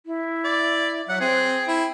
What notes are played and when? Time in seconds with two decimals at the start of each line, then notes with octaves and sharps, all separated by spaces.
0.06 E4
0.44 D5
1.09 F#3 E5 F#5
1.20 C4 G#4 G5
1.68 E4